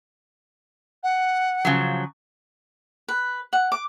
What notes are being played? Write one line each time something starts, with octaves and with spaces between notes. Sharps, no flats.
F#5
C#3 F3 F#3
B4
F#5
D6